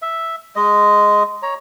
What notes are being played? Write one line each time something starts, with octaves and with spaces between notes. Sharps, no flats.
E5
G#3 D#5
C#5 A#5